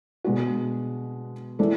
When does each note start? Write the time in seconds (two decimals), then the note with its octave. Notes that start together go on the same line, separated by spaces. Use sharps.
0.24 B2 G#3 D4 F#4
1.59 E3 G#3 D4 A4